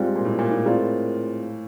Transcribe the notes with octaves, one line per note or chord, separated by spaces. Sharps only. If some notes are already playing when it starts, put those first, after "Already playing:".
Already playing: G#2 G3 C4 F4 G#4
A#2
A2
A#2
A2
A2 G#3 C4 F4 A#4 D5